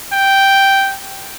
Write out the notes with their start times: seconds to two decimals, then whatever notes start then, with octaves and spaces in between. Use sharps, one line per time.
0.12 G5